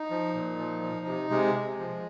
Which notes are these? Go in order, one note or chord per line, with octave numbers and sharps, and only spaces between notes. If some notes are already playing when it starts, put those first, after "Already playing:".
Already playing: D#4
F3
A#2
F3
F3
C3
C3 G#3
C3
F3